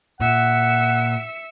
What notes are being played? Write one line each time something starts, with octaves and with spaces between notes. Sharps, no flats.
A#2 E5 F#5 C#7